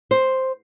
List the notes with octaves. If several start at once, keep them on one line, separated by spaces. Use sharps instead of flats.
C5